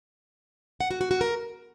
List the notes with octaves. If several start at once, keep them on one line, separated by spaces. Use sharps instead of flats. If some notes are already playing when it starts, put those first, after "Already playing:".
F#5
F#4
F#4
F#4
A#4